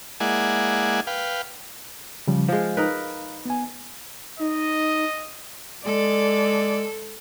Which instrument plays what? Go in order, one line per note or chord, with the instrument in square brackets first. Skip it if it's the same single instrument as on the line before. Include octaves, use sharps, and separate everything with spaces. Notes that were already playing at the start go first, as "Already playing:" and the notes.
[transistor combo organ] G#3 A#3 E4 D5 F#5 G#5
B4 F5 G5
[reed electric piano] C#3 F3 G3
[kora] F3 G#3 [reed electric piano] F5
[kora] D#4 A#4 B4
[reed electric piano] B3 G#5
[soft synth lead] D#4 [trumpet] D#5
[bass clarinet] G#3 [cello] A4 [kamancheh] D5